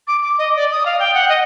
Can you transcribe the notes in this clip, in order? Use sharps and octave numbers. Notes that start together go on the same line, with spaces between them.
D6
D6
D#5
D5
D#6
F5
G5
F#5
D#5